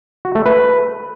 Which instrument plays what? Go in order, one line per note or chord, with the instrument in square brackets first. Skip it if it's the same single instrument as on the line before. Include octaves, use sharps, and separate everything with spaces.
[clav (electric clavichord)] F#4
A3
B4